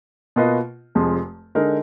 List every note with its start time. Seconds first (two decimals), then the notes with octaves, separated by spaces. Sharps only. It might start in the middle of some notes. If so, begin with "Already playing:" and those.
0.36 B2 A#3 F4 B4 D#5
0.95 F1 F2 F3 G#3
1.55 D3 G#3 D#4 A#4